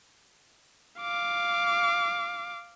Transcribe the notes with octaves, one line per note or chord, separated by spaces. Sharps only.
F5 D6